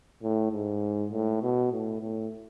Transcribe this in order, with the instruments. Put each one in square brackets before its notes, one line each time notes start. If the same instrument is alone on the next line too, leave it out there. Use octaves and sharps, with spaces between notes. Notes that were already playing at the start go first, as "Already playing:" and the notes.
[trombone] A2
G#2
A2
B2
A2
A2